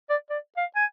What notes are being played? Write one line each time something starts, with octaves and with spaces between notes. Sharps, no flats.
D5
D5
F5
G#5